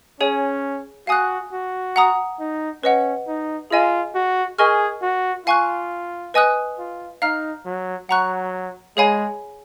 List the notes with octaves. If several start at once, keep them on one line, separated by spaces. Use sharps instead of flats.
C#4 G#4 C#5 G#5
F#4 F5 G#5 D#6 F#6
F#4
F#5 A#5 D#6
D#4
C#4 B4 D#5 F#5
D#4
F4 G#4 D#5 G#5
F#4
G#4 A#4 D#5 G#5 C#6 F6
F#4
F4 F5 G#5 C#6 F#6
B4 D#5 G#5 D#6 F#6
F4
D#4 F5 A#5 F6
F#3
F#3 F#5 A#5 C#6 F#6
G#3 G#4 C#5 F5 G#5 B5